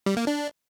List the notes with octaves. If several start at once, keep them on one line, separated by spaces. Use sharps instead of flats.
G3
A#3
D4